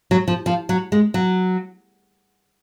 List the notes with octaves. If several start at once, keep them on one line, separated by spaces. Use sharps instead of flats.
F#3
F3
F3
F#3
G#3
F#3